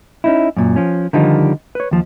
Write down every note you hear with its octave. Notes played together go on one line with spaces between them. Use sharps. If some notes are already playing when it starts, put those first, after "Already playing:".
C#4 D#4 E4
F#2 A#2
F3 C#4
D3 D#3 F3 G3 D#4
B4 C#5
D#2 F3